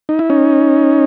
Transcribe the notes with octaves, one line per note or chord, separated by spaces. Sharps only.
D#4
E4
C#4 D#4